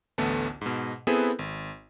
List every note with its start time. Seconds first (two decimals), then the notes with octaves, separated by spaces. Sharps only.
0.18 A1 D2 A3 B3 A5
0.61 G#2 B2
1.07 B3 C4 E4 G#4 A4 B4
1.39 G#1